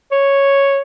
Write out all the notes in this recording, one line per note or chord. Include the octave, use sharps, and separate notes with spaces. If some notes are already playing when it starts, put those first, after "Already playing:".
C#5